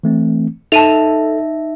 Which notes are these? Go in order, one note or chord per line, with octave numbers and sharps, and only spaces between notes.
E3 A3 C4
D#4 A4 E5 A5 D#7 F7